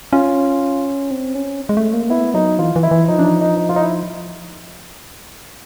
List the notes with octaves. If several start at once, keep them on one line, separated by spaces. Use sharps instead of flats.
C#4 F4
C4
C#4
G#3
A3
A#3
B3 E4
F#3 D#4
E3 F4
E3
E4
E3
F3 D#4
D4
D#4
D#4
D#4
F4
D#4
E4